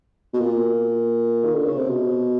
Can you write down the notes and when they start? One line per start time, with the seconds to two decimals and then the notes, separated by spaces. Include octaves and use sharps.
0.33 B2
0.40 A#2
1.44 D#3
1.55 D3
1.66 C#3
1.77 C3
1.89 B2